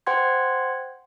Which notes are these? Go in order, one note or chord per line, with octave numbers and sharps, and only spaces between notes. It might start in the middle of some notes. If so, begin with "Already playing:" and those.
C5 F#5 G5 C6 G#6